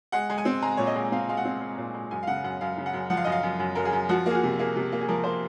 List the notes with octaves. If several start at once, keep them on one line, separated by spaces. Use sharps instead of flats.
G#3 F#5
G#3
G#5
C4
G#3 A#5
A#2 C#5
D#5
G#3
C4 F5
G#3 F5
F#5
C4
G#3
A#2
G#3
F#2 G#5
F5
C#3 F#5
F#2 F#5
F#2 F5
C#3
F#5
F#2
F3 F#5
F5
F#2 D#5
F5
F#2
F#2
F#2 A#4
G#4
F#2
F3 F#4
A#3 G#4
F#4
C3
A#3 G#4
C3
A#3
G#4
F3 A#4
A#3 C5